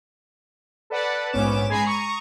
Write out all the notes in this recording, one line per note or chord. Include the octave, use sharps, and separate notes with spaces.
A4 B4 D5 F#5
A#1 G#2 B3 C#4 D6 E7
G#3 G#4 G#5 A#5 B5 C7
A#5 C#6 D#6